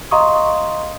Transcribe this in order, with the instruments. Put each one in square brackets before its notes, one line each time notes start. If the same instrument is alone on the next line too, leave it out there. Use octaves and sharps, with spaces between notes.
[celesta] D#5 F5 A#5 C6 C#6 D#6